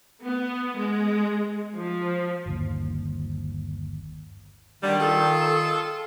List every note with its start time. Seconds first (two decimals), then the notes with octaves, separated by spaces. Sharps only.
0.24 B3
0.77 G#3
1.75 F3
2.46 G1 D#2
4.83 D3 D#3 G3
5.00 F4 G#4 A4